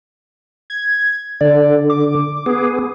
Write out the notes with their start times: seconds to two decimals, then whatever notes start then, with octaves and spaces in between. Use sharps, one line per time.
0.70 G#6
1.41 D3 D5
1.90 D6
2.46 B3 G#4